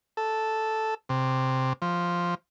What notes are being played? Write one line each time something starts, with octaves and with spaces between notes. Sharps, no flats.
A4
C3
F3